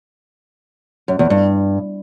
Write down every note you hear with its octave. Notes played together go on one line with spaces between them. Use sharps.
F#2
E2
G2